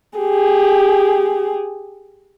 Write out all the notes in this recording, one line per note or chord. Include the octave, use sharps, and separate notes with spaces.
G4 G#4